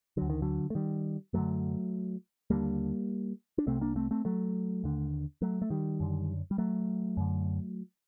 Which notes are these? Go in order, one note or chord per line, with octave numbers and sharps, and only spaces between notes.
D2 D3 F#3
D#3
D3 F#3
A3
D#3 G3
F#2 D3 F#3 A3
D#2 D3 G3 A#3
D4
C2 C3 A3 C4
A#3 D4
A3 C4
A3 C4
F#3 A3
D#2 D3
F#3 A3
A3
D#3 G3
F#2 D3
G3
F#3 A3
F#2 D3